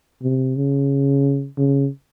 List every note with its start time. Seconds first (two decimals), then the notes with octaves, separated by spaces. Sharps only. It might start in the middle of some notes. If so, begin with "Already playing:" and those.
0.22 C3
0.56 C#3
1.58 C#3